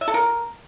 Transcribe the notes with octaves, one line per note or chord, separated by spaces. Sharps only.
E5
A4
A#4